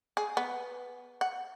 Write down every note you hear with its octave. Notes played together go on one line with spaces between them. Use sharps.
G#4
B3
F#5